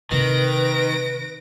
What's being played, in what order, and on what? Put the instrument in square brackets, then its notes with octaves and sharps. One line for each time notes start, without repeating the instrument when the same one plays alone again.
[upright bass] C3 [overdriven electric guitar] D#3 [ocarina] B4 [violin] A#6 D7